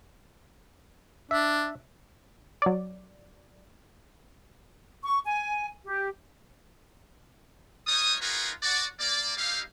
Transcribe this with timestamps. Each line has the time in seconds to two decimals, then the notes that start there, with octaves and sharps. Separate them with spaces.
1.31 D4 E5
2.62 F#3 D5
5.04 C#6
5.26 G#5
5.85 G4
7.88 G3 D#4 F4 C#5 D#6
8.21 D#4 F4 F#4 G#4 A#4 B4
8.63 F#4 D5
9.00 A#3 D5
9.37 G3 D#4 E4 G4 F5